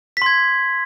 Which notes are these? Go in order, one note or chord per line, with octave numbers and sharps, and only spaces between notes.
C6 G#6 B6